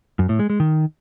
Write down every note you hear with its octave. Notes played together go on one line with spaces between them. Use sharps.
F#2
A2
G#3
G#3
D#3